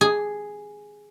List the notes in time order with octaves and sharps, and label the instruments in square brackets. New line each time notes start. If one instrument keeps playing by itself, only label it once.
[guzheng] G#4